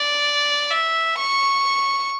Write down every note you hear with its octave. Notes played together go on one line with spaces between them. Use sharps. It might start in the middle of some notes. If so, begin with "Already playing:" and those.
Already playing: D5
E5
C#6